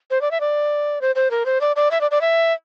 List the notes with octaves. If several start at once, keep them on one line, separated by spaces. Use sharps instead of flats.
C5
D5
E5
D5
C5
C5
A#4
C5
D5
D5
E5
D5
D5
E5